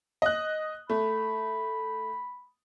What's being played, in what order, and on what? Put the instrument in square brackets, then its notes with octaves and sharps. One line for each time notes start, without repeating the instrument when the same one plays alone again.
[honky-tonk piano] D#5 F#6
[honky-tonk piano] A3 [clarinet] B5